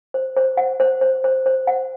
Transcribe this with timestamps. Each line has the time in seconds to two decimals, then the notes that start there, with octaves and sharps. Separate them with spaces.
0.14 C5
0.36 C5
0.57 F#5
0.80 C5
1.01 C5
1.24 C5
1.46 C5
1.67 F#5